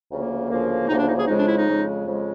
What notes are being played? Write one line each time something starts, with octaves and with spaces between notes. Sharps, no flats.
D2 C#3 F3 A#3
D2 C#3 F3 A#3
D2 C#3 F3 A#3 D#4
D4
D#4
G#4
F2 C#3 F3 G#3 D#4
D4
E4
D#4
F2 C#3 F3 G#3
F2 C#3 F3 G#3